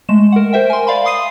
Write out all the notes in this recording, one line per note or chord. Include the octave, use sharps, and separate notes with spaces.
G#3 A3 E7
A#4 F#5
A#4 C5 E5 G5
G#5 C6
D5 F5 B5 C6
F5 C6 D#6 C7 D#7